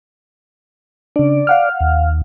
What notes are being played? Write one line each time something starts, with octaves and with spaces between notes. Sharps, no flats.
C#3 D4 D5
F5 F#5 F6
D#2